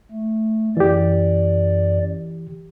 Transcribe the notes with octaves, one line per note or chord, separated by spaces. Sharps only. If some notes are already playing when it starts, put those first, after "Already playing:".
A3
F#2 E3 G4 D5